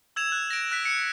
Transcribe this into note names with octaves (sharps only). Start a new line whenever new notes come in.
E6 G#6 E7 F7
F#6
A#6 D7
F#6 B6
C#7